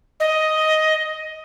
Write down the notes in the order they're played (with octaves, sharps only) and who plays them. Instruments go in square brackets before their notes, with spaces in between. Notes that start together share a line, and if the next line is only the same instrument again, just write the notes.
[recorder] D#5